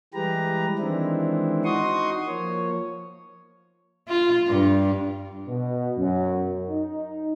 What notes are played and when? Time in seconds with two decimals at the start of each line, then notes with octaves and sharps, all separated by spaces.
0.14 E3 G3 G#3 G4 B4 A#5
0.79 D#3 E3 G#3 C4 D4 E4
1.64 D#4 F#4 C6 C#6 D#6
2.26 F3 A#3 C#5
4.08 F4
4.47 G2
5.48 B2
5.96 F#2
6.70 D#4